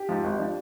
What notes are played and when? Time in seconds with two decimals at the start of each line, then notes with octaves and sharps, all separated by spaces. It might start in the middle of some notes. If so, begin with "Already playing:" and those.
Already playing: G4
0.09 G#2 F3
0.24 G#1
0.39 F3 D4